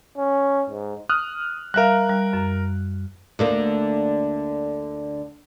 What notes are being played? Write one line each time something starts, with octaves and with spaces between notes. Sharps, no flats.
C#4
G#2
D#6 F6 F#6
G3 A#4 E5 F5 F#6
G3
F#2
D2 D3 A#3